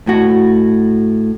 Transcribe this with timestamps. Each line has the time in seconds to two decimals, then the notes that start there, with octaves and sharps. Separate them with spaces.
0.07 A2 F#4